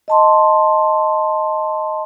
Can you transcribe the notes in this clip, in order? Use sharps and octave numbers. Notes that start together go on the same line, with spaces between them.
D#5 A5 C6